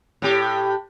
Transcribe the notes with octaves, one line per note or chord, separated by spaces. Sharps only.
A2 G4